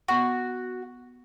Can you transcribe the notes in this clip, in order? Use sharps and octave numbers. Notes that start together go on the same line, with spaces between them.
B3 F#4 C#6